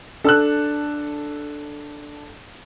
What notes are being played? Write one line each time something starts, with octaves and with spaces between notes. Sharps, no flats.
D4 A4 E6 F#6